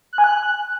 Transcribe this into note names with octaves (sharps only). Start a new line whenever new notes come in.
F#6
G#5
F#6